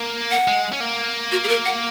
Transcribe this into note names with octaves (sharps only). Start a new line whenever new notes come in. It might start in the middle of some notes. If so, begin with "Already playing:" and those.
Already playing: A#3
F#5
G#3
C#4
A#3
F#4
G#4
A#4
F#5